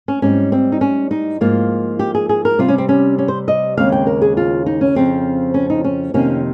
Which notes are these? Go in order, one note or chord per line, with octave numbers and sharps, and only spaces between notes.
C#4
G#2 G3 C4 C#4
C4
D#4
C#4
D#4
G#2 F3 A#3 F4
G4
G#4
G#4
A#4
C3 G3 C4 F4
C#4
C4
C#4
C#4
C5
D#5
D#2 C#3 G#3 C4 F5
G5
A#4
G#4
F4
D#4
C#4
F2 C#3 F3 C4
C#4
D#4
C#4
F2 C3 D#3 A#3 C#4